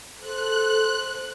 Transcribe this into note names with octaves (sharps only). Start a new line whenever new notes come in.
A4 C5 F#6